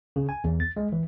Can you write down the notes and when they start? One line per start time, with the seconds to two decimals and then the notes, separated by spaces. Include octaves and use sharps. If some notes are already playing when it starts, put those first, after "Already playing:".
0.16 C#3
0.29 G#5
0.44 E2
0.60 A6
0.77 G#3
0.92 E3